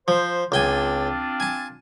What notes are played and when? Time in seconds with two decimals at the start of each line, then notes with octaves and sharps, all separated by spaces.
0.08 F3 C5
0.52 C#2 C4 D4 F4 G5 G#5
1.40 G#5 A5